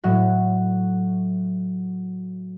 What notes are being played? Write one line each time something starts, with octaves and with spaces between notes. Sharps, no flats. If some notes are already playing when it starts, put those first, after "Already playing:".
A2 F#3 F#4